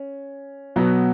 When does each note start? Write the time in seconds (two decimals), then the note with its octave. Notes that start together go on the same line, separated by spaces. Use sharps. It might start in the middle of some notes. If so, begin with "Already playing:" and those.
Already playing: C#4
0.76 B2 F#3 B3